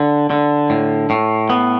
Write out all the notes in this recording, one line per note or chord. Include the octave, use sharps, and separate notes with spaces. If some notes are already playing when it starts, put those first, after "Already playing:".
Already playing: D3
D3
A2
A2
B3